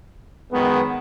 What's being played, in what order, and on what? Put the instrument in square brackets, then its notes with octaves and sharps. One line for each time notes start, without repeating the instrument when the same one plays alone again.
[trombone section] F#2 D#3 G#3 B3